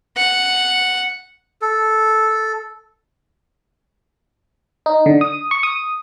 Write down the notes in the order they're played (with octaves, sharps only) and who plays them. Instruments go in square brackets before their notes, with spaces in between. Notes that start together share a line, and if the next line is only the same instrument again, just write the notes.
[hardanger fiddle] F#5
[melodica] A4
[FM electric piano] D#4
D3
D#6
C#6
D#6